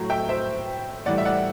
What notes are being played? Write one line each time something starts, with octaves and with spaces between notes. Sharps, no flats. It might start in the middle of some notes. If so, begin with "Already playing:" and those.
Already playing: A2 F#3
E5 G5
C5 E5
A2 E3 G3 D5 F#5
E5
D5 F#5